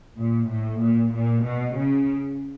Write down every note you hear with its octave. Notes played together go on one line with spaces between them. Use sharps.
A#2
A2
A#2
A#2
B2
C#3